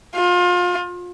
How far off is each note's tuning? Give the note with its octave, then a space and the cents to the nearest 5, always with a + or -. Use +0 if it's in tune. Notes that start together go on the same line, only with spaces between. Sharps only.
F4 +30